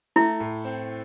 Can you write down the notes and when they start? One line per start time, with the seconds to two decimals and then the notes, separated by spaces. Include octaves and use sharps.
0.16 A3 E4
0.40 A2
0.65 C4